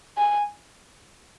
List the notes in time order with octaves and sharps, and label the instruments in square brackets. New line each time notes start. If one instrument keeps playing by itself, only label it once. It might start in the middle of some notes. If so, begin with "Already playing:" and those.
[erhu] G#5